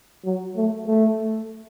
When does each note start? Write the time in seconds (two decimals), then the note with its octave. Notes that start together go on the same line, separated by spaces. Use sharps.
0.25 F#3
0.56 A3
0.87 A3